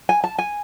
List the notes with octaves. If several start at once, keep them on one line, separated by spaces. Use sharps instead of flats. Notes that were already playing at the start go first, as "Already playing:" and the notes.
G#5
A5
G#5